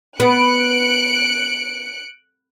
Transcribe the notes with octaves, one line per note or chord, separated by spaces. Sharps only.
B3 F#6 C#7 D7